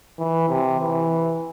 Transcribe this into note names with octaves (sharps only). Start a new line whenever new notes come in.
E3
C3
E3